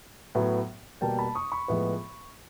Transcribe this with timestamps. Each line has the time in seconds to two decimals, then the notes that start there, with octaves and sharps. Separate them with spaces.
0.35 A2 F#3 B3
1.01 B2 G3 A#3 G5 A5
1.19 A5 B5
1.35 C#6 D#6
1.52 B5 C#6
1.68 A2 F3 G#3 B3